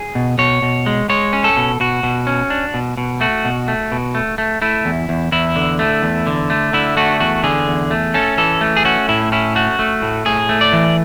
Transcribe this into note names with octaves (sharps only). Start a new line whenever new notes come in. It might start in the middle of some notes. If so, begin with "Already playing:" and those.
Already playing: G#4
B2
B2 C#5
B2
G#3
G#3 C#5
C#4
A4
B2
B2 F#4
B2
C#4
D4
B2
B2
A3 F#4
B2
A3
B2
A3
A3
A3 E4
E2
E2
E2 E4
D3
A3
E2
D3
A3
D3 E4
A3 F#4
E2 F#4
D3 G#4
E2
A3
C#4 A4
E3 A4
A3
G#4
C#4 F#4
A2 E4
C#4 E4
A3 F#4
A3
A2
A2 G#4
A3
D5
E3